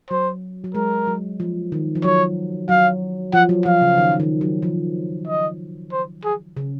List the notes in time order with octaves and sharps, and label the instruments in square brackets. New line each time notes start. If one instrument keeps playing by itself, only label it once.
[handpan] F#3 [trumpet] C5
[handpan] F#3
[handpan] G#3 [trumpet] A#4
[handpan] F#3
F3
D#3
F3
[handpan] F#3 [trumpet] C#5
[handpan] F#3 [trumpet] F5
[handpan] F3 [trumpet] F#5
[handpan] F#3
[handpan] F3 [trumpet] F5
[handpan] C#3
D#3
D#3
F#3
F3
[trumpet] D#5
C5
G#4
[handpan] C#3